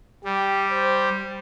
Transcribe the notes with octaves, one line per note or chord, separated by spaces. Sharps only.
G3 G4
C5